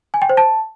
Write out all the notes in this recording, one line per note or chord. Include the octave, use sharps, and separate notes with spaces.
G#5
G5
C5
A5